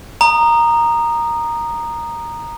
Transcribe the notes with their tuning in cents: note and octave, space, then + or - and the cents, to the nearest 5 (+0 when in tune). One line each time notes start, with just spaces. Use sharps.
A#5 +0 D#6 -20